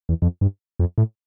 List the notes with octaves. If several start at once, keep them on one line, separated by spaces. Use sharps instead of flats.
E2
F2
G2
F2
A2